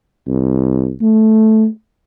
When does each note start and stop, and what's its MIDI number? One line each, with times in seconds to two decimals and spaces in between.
0.28 0.92 36
1.02 1.67 57